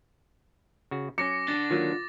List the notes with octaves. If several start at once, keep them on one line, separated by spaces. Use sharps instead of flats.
C#3 F#4
F#3 C#4 D6 A#6 C#7
D3 A6
D#3 F#3 A#3 F4